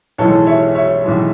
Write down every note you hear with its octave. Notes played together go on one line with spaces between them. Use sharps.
B1 A2 E3 G#3 A4 C#5
C#5 E5
C#5 E5
B1 A2 E3 G#3